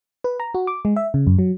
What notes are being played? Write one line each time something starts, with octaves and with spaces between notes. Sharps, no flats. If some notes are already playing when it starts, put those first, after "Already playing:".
B4
A#5
F#4
D6
G#3
E5
C#3
F#2
F#3